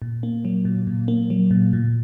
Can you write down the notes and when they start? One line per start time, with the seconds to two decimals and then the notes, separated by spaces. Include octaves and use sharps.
0.02 A#2
0.23 A#3
0.45 F#3
0.65 A#2
0.87 A#2
1.08 A#3
1.30 F#3
1.51 A#2
1.73 A#2